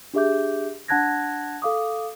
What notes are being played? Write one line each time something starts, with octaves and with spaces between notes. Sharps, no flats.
D4 G4 G#4 E5 D6 G6
D4 F#5 A5 F#6 G#6 A#6
A4 F5 D6 D#6